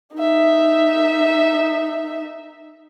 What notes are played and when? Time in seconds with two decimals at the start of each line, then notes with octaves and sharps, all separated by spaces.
0.16 D#4 E5